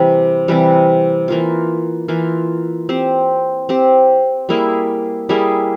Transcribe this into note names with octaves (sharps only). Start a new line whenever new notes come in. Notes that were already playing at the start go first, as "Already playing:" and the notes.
Already playing: C3 E3 G3
C3 E3 G3
E3 A#3 F4
E3 A#3 F4
C4 G4 C5
C4 G4 C5
G3 A#3 E4 G#4
G3 A#3 E4 G#4